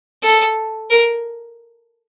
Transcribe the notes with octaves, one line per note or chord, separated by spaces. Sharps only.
A4
A#4